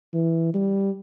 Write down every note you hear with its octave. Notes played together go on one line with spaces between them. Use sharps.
E3
G3